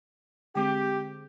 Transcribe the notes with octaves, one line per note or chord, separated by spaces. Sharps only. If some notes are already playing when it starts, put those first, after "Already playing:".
D3 G#3 C4 G4